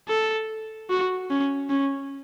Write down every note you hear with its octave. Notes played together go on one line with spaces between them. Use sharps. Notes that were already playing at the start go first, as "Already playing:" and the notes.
A4
F#4
C#4
C#4